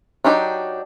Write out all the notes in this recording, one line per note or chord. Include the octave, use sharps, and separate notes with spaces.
F#3 D4 D#4 G4